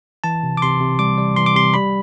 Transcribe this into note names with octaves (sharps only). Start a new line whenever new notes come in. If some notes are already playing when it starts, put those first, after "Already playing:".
E3 A5
C3
D6
C3 C6
C3
G3 D6
G3
E3 C6
D6
C3 C6
G3 B5